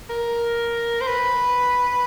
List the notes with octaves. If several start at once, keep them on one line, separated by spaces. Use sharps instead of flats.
A#4
C5
B4